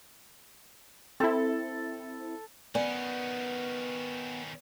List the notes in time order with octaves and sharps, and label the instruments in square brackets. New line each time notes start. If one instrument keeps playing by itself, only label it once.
[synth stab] C4 E4 [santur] A4
[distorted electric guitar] D#3 C#4 [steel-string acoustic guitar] B3 [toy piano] D5 G#5